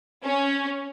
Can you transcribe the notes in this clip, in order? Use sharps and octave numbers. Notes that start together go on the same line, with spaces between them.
C#4